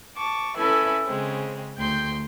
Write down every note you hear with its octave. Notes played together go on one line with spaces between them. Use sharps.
A5 C#6 D6
C#4 E4 A4 B4 E5 G#5
C#3 G#3 C4
D2 G5 C6 G6